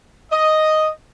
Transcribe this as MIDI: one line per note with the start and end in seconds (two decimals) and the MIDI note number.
0.32 0.88 75